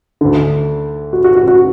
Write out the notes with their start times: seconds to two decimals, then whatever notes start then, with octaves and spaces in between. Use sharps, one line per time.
0.21 D2 D3
1.13 F#4
1.24 F#4
1.36 F#4
1.48 F#4